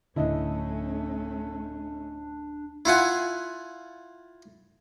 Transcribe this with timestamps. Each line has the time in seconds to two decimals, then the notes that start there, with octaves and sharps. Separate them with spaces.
0.16 D1 D3 A3 C#4 D4 E4 D#5
2.85 E4 F4 F#5 G#5